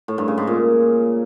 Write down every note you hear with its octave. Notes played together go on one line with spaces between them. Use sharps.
A2
G2
C#3
G#2
A#2